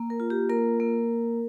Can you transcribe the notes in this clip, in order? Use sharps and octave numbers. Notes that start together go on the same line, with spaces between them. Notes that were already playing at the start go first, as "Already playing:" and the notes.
Already playing: A#3
A#4
F4
G4
A#3 A#4
A#3